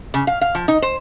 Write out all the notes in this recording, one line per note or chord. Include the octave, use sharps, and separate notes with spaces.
C#3
F5
F5
F3
D#4
C5